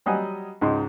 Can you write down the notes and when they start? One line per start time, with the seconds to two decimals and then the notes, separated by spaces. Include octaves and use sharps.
0.06 F#3 G3 D#5 F#5 G#5
0.61 C#2 G#2 D#4 C6